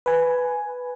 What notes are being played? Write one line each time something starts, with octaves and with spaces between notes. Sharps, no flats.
B4 G#5